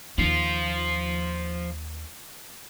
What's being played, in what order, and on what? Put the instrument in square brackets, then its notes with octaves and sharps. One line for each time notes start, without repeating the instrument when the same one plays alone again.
[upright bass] D#2 D#4 [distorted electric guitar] F3 F4